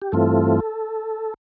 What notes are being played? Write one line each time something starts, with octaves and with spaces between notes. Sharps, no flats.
G4
G2 E3 A3 C4 F4 A4